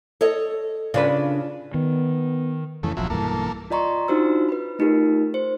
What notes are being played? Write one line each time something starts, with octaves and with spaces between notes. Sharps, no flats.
A4 C#5 D#5
C#3 D4 F4 B4 D5
D#3 B3
F2 C#3 E3 A3
D1 A#1 F3 F#3 E4
B1 G2 E3 A#3 A4
F4 D5 D#5 A#5 C6 C#6
D4 D#4 F4 F#4 C5 E6
B4 B5
A3 D#4 F4 G4 A#4
C5